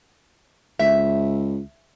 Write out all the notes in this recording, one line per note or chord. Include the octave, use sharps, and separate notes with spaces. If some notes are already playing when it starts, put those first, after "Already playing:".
C#2 E5